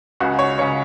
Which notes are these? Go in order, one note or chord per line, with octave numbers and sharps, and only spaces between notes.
C#2 C#3 F#4
C#5
C#2 C#3 C#5